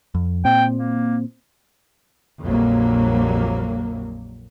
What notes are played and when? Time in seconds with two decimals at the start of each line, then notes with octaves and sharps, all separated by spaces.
0.15 F2
0.45 A#2 C4 G5
0.77 A#3
2.44 A#1 F2 F#3 G3 A#3